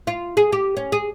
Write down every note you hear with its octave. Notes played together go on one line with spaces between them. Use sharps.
F4
G#4
G4
C#4
G#4